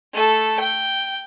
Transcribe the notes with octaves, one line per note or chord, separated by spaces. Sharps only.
A3 A4
G5